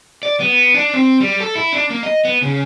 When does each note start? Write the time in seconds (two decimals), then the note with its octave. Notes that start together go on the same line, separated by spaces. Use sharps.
0.23 D5
0.40 B3
0.74 D4
0.93 C4
1.20 G3
1.40 A4
1.55 E4
1.73 D4
1.90 A#3
2.03 D#5
2.25 B3
2.42 C#3